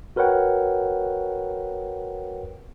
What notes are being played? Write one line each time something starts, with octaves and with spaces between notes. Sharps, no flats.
F#4 A#4 B4 C#5 F#5 G5